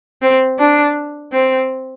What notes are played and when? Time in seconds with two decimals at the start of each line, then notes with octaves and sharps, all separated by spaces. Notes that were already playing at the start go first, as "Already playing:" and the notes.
0.22 C4
0.59 D4
1.33 C4